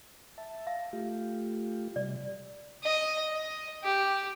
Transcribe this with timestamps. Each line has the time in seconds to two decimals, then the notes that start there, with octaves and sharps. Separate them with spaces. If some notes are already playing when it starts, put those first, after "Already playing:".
0.38 E5 A5
0.67 F5
0.93 A3 F4 G4
1.96 C3 G3 D5
2.83 D#5
3.31 D#5
3.84 G4